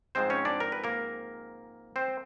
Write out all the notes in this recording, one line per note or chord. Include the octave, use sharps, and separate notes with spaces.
G#2 F3 G#3 C4 C5
C#4 C#5
D4 D5
A#4
B4
A#3 A#4
C4 C5